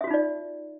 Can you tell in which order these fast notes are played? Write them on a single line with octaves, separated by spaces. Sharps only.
E5 F#4 F4 D#4 D5